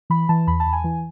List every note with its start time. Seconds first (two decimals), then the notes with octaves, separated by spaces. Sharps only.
0.10 E3 B5
0.29 E3 A5
0.47 E2 B5
0.60 A5
0.66 E2
0.73 G#5
0.84 E3